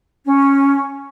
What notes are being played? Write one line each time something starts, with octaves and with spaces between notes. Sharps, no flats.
C#4